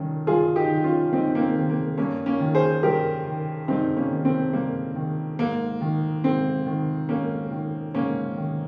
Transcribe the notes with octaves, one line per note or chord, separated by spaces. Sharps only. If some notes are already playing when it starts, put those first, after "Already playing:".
Already playing: G2 D#3 C#4
G2 F4 G#4
D#4 G4
D#3
C#4 F4
G2 C4 D#4
A#3
C4
D#3
A#3
G2 A#3 C#4
A#3 C#4
D#3
G#4 C5
G2 G4 A#4
D#3
G2 C4 D#4
A#3 C#4
D#3
C4
G2 A#3
D#3
G#2 A#3
D#3
G#2 C4
D#3
G#2 A#3 C#4
D#3
G#2 A#3 C#4
D#3